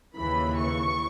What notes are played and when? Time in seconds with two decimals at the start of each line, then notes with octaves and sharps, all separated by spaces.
0.15 D#2 C#3 E3 B5
0.57 C#6